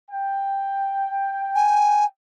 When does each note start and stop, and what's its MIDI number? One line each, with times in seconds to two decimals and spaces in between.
0.10 2.06 79
1.55 2.05 80